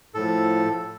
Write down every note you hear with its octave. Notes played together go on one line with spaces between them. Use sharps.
A2 F3 A4